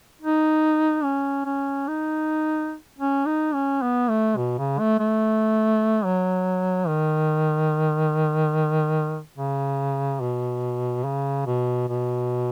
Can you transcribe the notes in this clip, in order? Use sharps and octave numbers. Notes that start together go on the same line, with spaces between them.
D#4
C#4
C#4
D#4
C#4
D#4
C#4
B3
A3
B2
C#3
A3
A3
F#3
D#3
C#3
B2
C#3
B2
B2